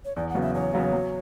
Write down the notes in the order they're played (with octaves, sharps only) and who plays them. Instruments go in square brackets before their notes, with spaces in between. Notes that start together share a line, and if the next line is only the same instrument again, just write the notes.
[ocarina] C#5
[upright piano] E2 [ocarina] D5
[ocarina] F#5
[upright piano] C#3 F#3 B3
[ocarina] E5
[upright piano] E2 [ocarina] C#5
[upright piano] C#3 F#3 B3
F#3